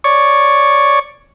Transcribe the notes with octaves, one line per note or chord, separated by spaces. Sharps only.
C#5 D5 C#6